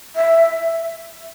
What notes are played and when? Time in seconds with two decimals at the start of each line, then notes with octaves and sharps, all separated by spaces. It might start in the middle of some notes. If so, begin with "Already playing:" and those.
0.16 E5